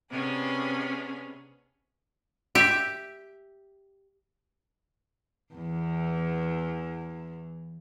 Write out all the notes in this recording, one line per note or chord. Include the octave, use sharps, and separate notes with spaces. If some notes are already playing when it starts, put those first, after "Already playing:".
C3 B3 C#4 D4 G#4
G4 E5
E2 E3